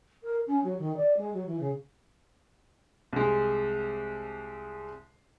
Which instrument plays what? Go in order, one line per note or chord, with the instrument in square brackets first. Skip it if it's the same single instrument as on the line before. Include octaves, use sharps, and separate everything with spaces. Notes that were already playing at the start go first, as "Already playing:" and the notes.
[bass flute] A#4
C#4
F#3
D#3
D5
G#3
F#3
E3
C#3
[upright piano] C2 G#3